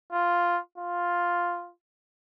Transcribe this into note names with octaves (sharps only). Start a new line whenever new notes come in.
F4
F4